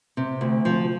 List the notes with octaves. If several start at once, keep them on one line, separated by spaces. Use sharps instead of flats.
C3
D2
F3